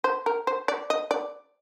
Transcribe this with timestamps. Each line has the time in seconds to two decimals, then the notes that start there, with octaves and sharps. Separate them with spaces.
0.04 C5
0.26 A#4
0.47 C5
0.68 D5
0.90 D#5
1.11 D5